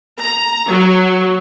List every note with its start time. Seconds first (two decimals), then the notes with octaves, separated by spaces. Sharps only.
0.22 A#5
0.70 F#3